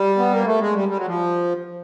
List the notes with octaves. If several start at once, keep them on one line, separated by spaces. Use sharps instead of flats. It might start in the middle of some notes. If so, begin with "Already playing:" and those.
Already playing: G3
B3
A#3
A3
G#3
G3
G3
F#3
F3